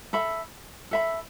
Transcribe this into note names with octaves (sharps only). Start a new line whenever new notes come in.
A4 E5 B5
A4 E5 B5